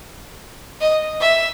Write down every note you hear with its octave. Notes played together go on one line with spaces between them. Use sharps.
D#5
E5